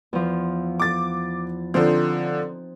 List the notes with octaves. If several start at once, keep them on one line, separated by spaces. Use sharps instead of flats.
E2 F3
D6 A6
D3 F3 C4 D#4 C5